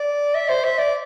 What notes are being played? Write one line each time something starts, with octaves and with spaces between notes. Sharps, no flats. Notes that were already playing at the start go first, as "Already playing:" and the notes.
Already playing: D5
E5
C5
E5
D5